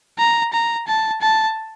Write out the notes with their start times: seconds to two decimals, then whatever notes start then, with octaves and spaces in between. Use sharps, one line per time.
0.19 A#5
0.53 A#5
0.88 A5
1.21 A5